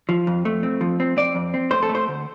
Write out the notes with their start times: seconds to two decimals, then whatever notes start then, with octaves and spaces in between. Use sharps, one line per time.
0.09 F3
0.27 F2
0.45 A3
0.63 C4
0.81 F3
1.00 C4
1.17 C4 D5
1.35 F2
1.54 C4
1.71 A3 C5
1.83 A4
1.89 A3
1.95 C5
2.08 D2